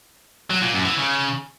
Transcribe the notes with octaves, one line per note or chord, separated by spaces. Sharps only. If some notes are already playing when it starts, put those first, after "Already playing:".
F#3
A#2
F#2
E3
C#3